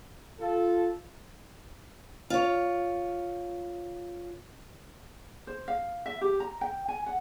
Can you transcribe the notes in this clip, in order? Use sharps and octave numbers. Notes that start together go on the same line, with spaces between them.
F4 A4
F4 C#5
C5
F5
E5
G4
A#5
G5
G#5
F#5